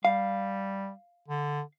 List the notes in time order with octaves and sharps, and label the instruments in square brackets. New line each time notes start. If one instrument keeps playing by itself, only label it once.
[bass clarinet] G3 [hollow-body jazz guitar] F5
[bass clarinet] D3